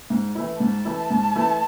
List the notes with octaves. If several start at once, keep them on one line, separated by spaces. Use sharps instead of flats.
G#2
E3 A3 E4
G#2 A5
E3 A3 E4
G#2
E3 A3 E4